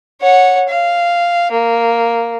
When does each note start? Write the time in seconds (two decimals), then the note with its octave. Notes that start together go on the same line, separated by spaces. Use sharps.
0.22 C#5 F#5
0.69 F5
1.51 A#3